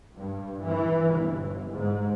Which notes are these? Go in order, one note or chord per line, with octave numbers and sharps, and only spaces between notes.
G2
E3
G1
G#2